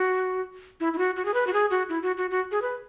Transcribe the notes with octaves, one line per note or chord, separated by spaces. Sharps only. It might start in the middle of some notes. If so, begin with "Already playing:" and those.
Already playing: F#4
E4
E4
F#4
F#4
G#4
B4
F#4
G#4
F#4
E4
F#4
F#4
F#4
G#4
B4